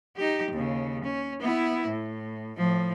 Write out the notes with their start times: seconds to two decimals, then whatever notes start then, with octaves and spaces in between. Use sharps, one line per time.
0.17 D#4 G4
0.51 D#2 C#3
1.04 C#4
1.41 B3 E4
1.88 A2
2.57 A2 F3